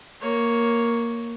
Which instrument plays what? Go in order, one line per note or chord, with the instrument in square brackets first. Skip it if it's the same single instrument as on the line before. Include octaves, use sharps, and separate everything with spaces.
[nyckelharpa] A#3 C#5